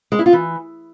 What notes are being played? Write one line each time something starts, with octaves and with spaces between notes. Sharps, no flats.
G#3
E4
F4
E3